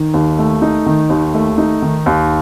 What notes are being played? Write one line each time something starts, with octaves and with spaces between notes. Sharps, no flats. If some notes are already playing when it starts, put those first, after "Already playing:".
Already playing: D#3 D#4
D#2
A3
D#4
D#3
D#2
A3
D#4
D#3
D#2